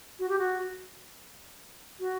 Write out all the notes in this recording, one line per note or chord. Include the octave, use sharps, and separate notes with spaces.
F#4
G4
F#4
F#4